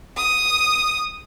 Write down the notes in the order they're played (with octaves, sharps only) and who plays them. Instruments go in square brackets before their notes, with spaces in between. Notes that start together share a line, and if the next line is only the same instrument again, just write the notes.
[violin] D#6